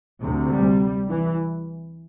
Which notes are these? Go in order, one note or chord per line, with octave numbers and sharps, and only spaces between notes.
D2 C3
G3
E3